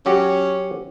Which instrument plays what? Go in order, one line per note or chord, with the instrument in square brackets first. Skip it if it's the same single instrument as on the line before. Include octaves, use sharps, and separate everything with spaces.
[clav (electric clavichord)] F#3 F#4 G4 [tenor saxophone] C#4